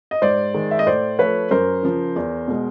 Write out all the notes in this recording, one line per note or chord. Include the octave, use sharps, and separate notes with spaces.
D#5
G#2 C5 D5
D#3 G#3
E5
D#5
A2 C5 D5
F3 A3 B4 C#5
F#2 A#4 C5
C#3 F3
E2
B2 G#3